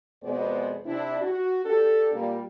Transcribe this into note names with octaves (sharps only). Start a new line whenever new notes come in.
F2 B2 G#3 B3 C5 D5
C3 D4 E4
F#4
D4 G4 A4
A#2 G3 A#3